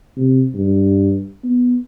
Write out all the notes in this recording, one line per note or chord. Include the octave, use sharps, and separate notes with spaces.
C3
G2
B3